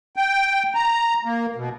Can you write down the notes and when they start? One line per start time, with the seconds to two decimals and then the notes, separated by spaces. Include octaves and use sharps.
0.16 G5
0.75 A#5
1.25 A#3
1.56 B2